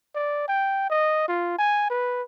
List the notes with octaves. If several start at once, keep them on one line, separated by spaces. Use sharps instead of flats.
D5
G5
D#5
F4
G#5
B4